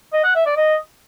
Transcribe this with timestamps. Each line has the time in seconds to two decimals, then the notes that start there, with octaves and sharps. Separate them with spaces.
0.13 D#5
0.24 F#5
0.35 E5
0.46 D5
0.57 D#5